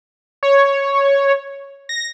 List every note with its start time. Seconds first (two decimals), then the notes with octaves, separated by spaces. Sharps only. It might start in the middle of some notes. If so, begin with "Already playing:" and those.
0.43 C#5
1.89 A#6